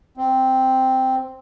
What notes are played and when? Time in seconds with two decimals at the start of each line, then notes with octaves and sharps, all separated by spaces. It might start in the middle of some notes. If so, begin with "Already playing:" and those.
0.17 C4